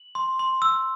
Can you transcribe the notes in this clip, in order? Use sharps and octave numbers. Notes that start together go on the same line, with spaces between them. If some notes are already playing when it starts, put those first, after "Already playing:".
Already playing: F#7
C6
C6
E6